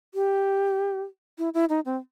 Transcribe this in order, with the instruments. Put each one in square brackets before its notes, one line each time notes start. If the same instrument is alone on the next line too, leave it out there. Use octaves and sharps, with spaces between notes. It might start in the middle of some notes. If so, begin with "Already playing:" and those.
[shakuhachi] G4
E4
E4
D#4
C4